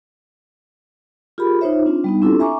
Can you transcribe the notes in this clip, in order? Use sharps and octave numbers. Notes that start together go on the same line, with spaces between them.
F4 G4 G#4 A#4 B5
D#4 F4 C5 C#5 E5
C4 D4 F4
G3 B3 D#4
C4 D4 E4 F4 G4 A4
E5 G#5 A#5 C#6 D6